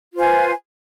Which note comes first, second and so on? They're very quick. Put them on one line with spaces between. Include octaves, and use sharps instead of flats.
F4 C5 G#5 B4